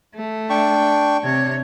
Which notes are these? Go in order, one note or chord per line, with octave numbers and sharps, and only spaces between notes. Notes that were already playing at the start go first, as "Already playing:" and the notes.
A3
D4 G5 C#6
C3 C#5